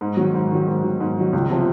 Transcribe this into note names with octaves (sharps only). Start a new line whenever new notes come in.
G#2
D#3 F#3
G#2
D#3 F#3
G#2
D#3 F#3
G#2
D#3 F#3
C#2
C3 F3